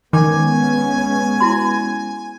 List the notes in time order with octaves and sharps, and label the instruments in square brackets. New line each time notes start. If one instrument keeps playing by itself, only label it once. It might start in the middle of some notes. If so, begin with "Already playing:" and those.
[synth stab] D#3 [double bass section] G#3 B3 C#4 [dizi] G#5 [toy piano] D6
[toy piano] E4 F#4 C6